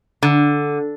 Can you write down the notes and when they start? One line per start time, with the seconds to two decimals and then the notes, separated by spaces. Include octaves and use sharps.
0.23 D3